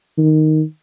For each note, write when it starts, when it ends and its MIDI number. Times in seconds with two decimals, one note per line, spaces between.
0.18 0.62 51